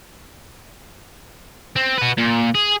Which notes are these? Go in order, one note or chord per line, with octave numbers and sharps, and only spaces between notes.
C4
F#4 B4
A#2
G#4